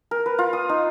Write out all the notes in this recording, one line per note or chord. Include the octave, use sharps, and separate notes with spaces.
A#4
B4
F4
D#6
D#4